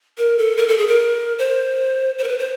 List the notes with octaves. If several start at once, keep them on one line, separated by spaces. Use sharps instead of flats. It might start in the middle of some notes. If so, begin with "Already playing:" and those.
A#4
A4
A#4
A4
G#4
A#4
C5
C5
A#4
B4
C5